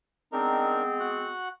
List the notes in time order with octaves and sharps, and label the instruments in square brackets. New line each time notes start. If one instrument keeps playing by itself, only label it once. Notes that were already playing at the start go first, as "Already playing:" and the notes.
[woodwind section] G#3 B3 C4 [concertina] D4 D#4 A#4
[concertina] F#4 F#5